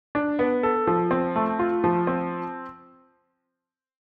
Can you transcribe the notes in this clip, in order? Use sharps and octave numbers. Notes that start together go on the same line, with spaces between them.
D4
B3
A4
F3
C4
A3
F4
F3
C4